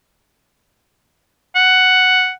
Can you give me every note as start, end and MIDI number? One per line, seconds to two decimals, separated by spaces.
1.56 2.31 78